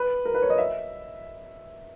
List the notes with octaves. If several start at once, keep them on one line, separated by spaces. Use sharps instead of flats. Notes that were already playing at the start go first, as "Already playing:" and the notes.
Already playing: B4
A#4
B4
C#5
D#5
E5